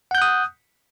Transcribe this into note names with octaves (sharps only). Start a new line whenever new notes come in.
F#5 D#6 F#6 G6